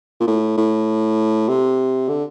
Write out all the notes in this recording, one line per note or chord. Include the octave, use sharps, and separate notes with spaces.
A#2
A2
A2
C3
D3